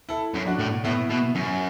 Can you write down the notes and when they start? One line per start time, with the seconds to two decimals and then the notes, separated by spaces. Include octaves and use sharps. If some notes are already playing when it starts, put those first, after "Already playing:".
0.09 E4 A4
0.34 F#2
0.46 D4 F#4
0.60 A2
0.85 A2 B3 E4
1.10 B2
1.35 F#2